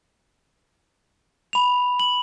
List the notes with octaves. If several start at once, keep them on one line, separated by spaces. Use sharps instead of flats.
B5 F7
F#7